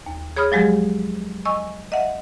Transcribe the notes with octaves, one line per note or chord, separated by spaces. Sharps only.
D#2
G#4 C#5 B5 D#6 F6
F3 F#3 G#3 G4 G#4
D#5 G#5 C#6 E6
D#5 E5 F#5